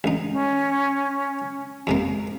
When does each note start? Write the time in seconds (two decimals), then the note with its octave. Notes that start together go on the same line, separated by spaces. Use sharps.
0.04 A1 D#4
0.32 C#4
1.87 F2 C3 A#3